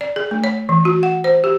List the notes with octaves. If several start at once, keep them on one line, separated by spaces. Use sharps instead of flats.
D5
G#4
A3
C#5
E3
F#4
F#5
C5
G4